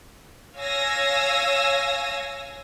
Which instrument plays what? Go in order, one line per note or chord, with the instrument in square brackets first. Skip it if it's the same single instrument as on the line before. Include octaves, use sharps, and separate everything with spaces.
[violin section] C#5 F5 G#5 E6 G#6 A#6